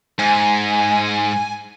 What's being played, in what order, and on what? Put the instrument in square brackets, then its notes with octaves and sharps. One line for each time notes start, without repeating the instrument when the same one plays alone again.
[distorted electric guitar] G#2 [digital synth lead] G#5